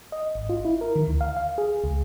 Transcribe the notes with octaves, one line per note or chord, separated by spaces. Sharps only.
D#5
G#1
F4
E4
A#4
D#3
D2
F5
F5
G#4
C#2